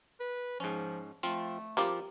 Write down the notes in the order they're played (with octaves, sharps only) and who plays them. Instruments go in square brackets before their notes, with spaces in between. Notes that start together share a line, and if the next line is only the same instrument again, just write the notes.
[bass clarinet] B4
[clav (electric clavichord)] G#2 C#4 [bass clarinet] F3
[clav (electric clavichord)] F3 C4 F4 [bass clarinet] A3
[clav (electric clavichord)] F3 C4 F4 [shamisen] G3 A#3 G4